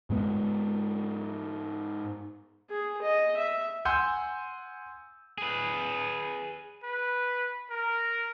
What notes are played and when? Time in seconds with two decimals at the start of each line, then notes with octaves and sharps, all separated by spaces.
0.10 G#2 G#3 B3
2.70 G#4
3.02 D#5
3.37 E5
3.85 F#5 G#5 C6 E6 G6
5.38 G#4 B4
6.83 B4
7.70 A#4